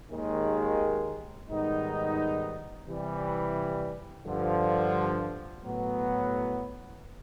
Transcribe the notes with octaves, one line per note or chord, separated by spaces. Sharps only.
D#2 D#3 G#3
G#2 D#3 G3 B3 D#4
C3 E3 G3
G2 D3 F3
A2 F#3 B3